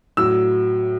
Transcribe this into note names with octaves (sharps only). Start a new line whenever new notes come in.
A2 F#3 E6